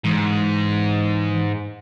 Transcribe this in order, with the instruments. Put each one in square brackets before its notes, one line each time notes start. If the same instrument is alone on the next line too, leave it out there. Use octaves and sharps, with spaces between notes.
[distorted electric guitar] G#2 [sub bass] E3